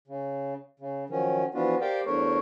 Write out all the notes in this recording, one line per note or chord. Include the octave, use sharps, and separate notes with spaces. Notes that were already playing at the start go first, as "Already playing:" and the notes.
C#3
C#3
D#3 F3 F#3 C#4
E3 F3 B3 D4 F4 F#4
G4 A#4 C5 D5 F5 G5
E2 G2 A3 A#4 C5 C#5